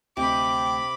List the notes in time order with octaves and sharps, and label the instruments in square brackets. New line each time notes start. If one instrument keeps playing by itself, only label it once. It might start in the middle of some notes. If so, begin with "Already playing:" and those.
[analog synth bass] D2 [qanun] C3 D#5 [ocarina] G5 [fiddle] B5 D6